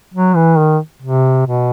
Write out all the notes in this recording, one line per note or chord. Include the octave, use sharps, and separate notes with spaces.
F#3
E3
D#3
C3
B2